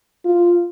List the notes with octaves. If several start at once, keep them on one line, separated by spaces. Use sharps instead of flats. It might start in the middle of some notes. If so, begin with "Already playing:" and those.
F4